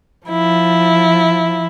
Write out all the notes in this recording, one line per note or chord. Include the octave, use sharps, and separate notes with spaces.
F3 E4